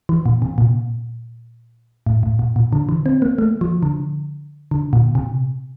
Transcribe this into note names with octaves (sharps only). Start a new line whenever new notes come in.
E3
A#2
C3
A#2
A2
A2
A#2
A#2
D3
E3
C4
A#3
A3
F3
D3
D3
A#2
C3